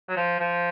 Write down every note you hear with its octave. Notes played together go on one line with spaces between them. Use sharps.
F#3
F3
F3